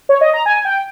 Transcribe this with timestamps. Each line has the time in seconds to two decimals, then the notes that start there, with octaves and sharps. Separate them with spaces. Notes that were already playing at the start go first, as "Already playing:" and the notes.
0.09 C#5
0.21 D#5
0.34 A#5
0.46 G#5
0.65 G5